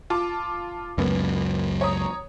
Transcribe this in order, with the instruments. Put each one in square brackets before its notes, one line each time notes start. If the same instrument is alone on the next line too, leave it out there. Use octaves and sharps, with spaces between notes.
[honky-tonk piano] F4 A5 D6
[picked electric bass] C#2 F#2 [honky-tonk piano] A#3 B3
[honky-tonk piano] C#5 A#5 D#6